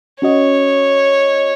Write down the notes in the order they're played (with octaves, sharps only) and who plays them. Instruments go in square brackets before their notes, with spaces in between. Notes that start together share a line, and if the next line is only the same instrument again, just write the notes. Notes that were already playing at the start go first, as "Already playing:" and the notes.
[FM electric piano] C#4 F#4 D#5 [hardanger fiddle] C#5